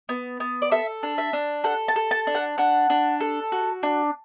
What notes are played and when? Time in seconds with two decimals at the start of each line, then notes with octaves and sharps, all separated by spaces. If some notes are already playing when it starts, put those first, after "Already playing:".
0.09 B3
0.40 B3
0.62 D5
0.71 A4 E5
1.03 D4
1.18 E5
1.33 D4
1.64 A4 F#5
1.88 A5
1.96 A4
2.11 A5
2.27 D4
2.35 F#5
2.58 D4 F#5
2.90 D4
3.20 A4
3.52 F#4
3.83 D4